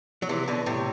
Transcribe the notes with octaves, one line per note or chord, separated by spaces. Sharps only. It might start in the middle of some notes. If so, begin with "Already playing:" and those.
F#3
C3 E3
B2 D3
A2 C3